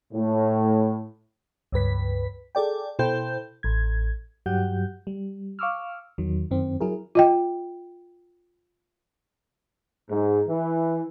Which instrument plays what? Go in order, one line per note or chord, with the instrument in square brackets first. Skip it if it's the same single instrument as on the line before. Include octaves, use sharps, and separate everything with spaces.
[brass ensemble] A2
[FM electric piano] C#2 G2 B4 B6
G#4 A4 D5 G5
B2 E4 A4 C5 G5 G6
A1 G#6
G2 F#3 G4 F#5 G6
G3
F5 C#6 D6 E6 F6
E2 D#3 F#3
F#2 D#3 C4
F#3 E4 G#4 A#4
[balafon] F4 D#5 G5
[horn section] G#2
E3